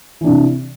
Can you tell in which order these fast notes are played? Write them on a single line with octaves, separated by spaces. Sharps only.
E3 D4 C3